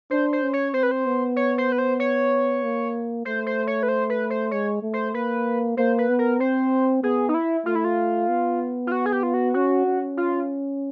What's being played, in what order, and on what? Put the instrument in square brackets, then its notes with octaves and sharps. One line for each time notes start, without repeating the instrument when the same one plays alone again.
[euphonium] D4 [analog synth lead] C5
[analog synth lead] C5
[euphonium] C#4
[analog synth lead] C#5
[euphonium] C4 [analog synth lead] C5
[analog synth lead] B4
C5
[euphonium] B3
[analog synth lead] C#5
C5
B4
C5
C#5
[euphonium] A#3
[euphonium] A3 [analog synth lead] C5
[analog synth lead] C5
C#5
B4
C5
B4
C5
[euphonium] G#3 [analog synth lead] C#5
[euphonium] A3
[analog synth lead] C5
[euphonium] A#3 [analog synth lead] B4
[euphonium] A#3 [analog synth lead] C5
[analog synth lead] B4
[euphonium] B3
[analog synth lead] A#4
[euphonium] C4 [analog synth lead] C5
[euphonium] B3 [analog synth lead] G#4
[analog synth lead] D#4
E4
[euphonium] A3 [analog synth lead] F4
[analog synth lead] E4
F4
[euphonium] B3
[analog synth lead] F4
F#4
G#4
G4
F4
F#4
[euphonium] C#4 [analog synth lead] F#4
[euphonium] C#4
[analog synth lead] F4